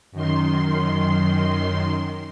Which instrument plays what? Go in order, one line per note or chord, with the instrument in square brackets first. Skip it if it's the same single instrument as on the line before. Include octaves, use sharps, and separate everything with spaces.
[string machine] F#2 D#3 C6